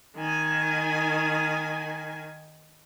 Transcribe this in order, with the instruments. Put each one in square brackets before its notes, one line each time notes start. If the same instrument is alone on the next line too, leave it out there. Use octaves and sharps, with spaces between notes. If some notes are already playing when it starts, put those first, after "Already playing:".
[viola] D#3 G#5